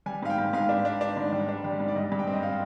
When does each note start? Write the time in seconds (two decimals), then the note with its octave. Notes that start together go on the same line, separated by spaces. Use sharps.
0.06 G3 G#5
0.23 G#2 F5
0.30 G5
0.38 G#2
0.53 G#2 F5
0.69 D4
0.85 D4
1.01 D4
1.17 G#2
1.32 G3
1.49 D4
1.64 G3
1.80 G#2
1.88 D5
1.96 G2 D#5
2.12 G2
2.19 G5
2.27 C4
2.33 D#5
2.43 C4 F5